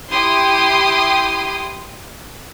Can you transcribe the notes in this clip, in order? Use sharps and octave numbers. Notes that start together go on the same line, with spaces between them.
E4 G4 C6 D#6